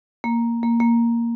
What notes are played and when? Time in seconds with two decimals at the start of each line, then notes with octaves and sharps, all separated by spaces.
0.24 A#3
0.63 A#3
0.80 A#3